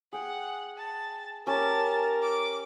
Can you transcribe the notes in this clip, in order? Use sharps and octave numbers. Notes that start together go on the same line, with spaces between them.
G#4 F#5 G5
A5
C#4 G4 A#4 A5
D6